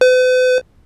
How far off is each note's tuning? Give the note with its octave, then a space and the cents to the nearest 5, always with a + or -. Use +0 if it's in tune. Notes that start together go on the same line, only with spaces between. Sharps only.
B4 +45